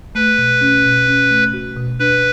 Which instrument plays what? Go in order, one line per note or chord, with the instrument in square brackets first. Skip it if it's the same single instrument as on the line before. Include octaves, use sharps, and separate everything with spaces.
[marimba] A3 [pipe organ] B4
[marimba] B2
C#4
B2
C#4
A3
F#4
B2
[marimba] D4 [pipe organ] B4